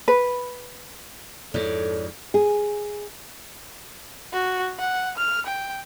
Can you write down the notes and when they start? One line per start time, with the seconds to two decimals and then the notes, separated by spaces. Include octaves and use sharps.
0.08 B4
1.54 F2 G#2 E4 A4 C#5 D5
2.34 G#4
4.33 F#4
4.79 F#5
5.17 F6
5.46 G5